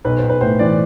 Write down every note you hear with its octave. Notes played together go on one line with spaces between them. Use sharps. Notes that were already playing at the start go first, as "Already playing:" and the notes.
B1 B4
C5
B1
B4
A2 C5
E3 D5